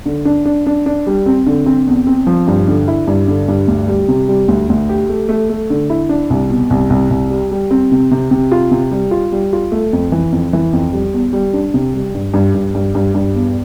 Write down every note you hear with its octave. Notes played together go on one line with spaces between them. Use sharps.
D3
D4
D4
D4
D4
G3
C4
D3
C4
E2
C4
F3
G2
D3
E4
G2
D3
G2
D2
G3
C3
G3
D2
D2
G4
A3
A3
A3
D3
E4
D4
C2
B2
C2
C2
C2
G3
G3
C4
C3
C3
C3
F4
C3
G3
F4
G3
F4
A3
F2
E3
F2
E3
F2
G3
E2
G3
D4
C3
G3
G2
G2
G2
G2
G2
G2
E2